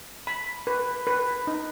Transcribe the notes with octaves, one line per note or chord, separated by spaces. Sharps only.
B5
B4
B4
D#4